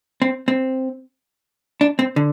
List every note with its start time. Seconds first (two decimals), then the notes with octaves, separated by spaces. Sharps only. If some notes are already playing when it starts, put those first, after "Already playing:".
0.22 C4
0.48 C4
1.81 D4
1.99 C4
2.16 D3